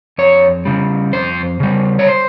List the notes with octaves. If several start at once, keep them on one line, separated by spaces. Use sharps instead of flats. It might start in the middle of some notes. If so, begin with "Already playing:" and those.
F2 C#5
C#3 G3
F2 C5
C#3 G3
C#5
C5